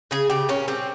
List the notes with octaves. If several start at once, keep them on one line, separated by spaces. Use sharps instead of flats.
C#3 G#4
C#3 G4
A#2 C#4
G3 C4